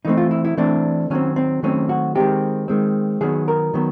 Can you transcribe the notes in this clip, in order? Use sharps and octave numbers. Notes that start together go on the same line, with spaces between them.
E3 A3 C4 D#4
F4
E4
E4
E3 A3 C4 D4
D#3 F#3 A3 C4 C#4
C4
D#3 F#3 A3 C4 C#4
F#4
D#3 G#3 C4 G4
D#3 G#3 C4
D#3 F#3 B3 G#4
A#4
D#3 F#3 B3